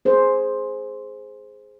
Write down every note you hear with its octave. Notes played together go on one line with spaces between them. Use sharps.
G#4 C5